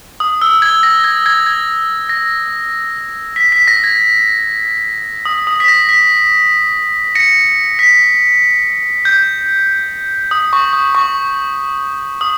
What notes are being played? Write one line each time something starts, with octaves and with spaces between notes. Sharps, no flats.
D#6
E6
G#6
A#6
G#6
G#6
G#6
A#6
B6
B6
A#6
G#6
D#6
D#6
B6
A#6
B6
A#6 C#7
B6
G6
D#6
C#6
D#6
C#6
D#6